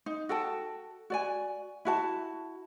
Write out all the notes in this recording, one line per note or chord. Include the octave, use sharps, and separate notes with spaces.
D#4
F#4 A4 G5 A5
F#4 D5 G#5
E4 F#4 A5